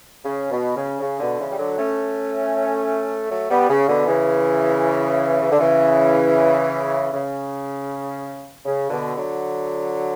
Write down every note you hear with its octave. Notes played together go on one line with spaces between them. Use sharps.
C#3
B2
C#3
C#3
B2 D3
C#3 E3
G3
D3 F#3
A3 C#4
F#3 A3
G3 B3
C#3
B2 D3
C#3 E3
C#3
D3
C#3 E3
C#3
C#3
B2 D3
D3 F#3